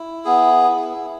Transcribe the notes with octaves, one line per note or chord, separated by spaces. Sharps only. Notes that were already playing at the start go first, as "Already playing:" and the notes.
Already playing: E4
B3 G#4
E4